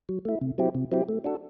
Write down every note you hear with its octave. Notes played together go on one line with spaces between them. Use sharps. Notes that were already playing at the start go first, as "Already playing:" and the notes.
F#3
A3 E4
C3
F#3 C4 E4 G4
C3
F#3 C4 E4 G4
A3
D4 F#4 A4